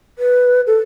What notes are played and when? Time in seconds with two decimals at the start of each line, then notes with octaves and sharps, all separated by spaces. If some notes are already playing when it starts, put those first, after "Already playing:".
0.19 B4
0.67 A4